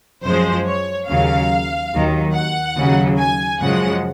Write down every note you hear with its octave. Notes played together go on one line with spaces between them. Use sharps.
F#2 F3 G#3 C5
C#5
D#2 C#3 F#3 F5
D#2 D#3 F#3
F#5
D#2 C#3 F#3
G#5
F#2 C#3 F3 G#3 F#5